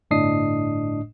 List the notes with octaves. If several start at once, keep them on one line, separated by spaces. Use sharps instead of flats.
G1 A2 D4 D#5 D#6 C7